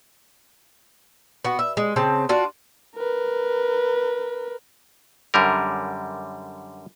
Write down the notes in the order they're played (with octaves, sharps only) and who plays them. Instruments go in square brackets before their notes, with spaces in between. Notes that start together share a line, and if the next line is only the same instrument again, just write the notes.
[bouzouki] B3 F#4
E5
G#3
C#3 C4 A5
D4 F4 F#4
[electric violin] A#4 B4
[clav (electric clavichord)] F#2 D3 G3 A#4